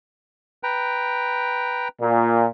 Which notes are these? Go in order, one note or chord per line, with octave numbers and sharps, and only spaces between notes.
B4 G5 A#5
A#2